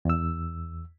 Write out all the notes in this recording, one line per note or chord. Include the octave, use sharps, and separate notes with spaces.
E2 E6